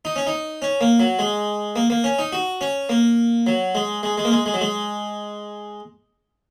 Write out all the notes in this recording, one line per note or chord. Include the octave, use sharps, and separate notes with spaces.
D#4
C#4
D#4
C#4
A#3
F#3
G#3
A#3
A#3
C#4
D#4
F#4
C#4
A#3
F#3
G#3
G#3
G#3
A#3
G#3
G#3
F#3
G#3